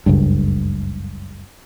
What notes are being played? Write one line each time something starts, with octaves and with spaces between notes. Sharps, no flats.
F#1 C#2 G2